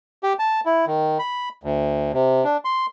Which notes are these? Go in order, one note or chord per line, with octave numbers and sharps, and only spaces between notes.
G4
A5
E4
D#3
B5
D2
C3
D4
C6